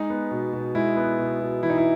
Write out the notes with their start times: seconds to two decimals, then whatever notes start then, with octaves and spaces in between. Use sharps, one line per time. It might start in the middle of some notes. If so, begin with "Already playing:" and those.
Already playing: G#3 D#4
0.10 B3
0.31 B2
0.53 B2
0.75 G#3 E4
0.97 B3
1.19 B2
1.41 B2
1.62 E3 E4
1.70 D#4
1.78 E4